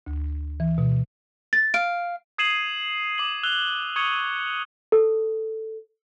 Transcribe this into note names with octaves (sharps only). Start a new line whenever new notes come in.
D2
E3
B2
A6
F5 D7
D#6 G#6 C7 D#7 E7 F#7
D6 C7 F#7
E6 F#6 F7 G7
C#6 D#6 G#6 C#7 D#7 G7
A4